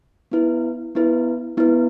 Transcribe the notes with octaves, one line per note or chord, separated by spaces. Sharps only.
B3 E4 B4
B3 E4 B4
B3 E4 B4